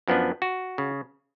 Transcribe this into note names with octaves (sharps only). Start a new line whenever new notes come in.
F#2 F3 B3 D4
F#4
C#3